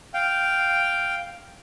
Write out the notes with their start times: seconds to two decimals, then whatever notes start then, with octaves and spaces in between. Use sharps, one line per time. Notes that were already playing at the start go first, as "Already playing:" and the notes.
0.14 F5 G5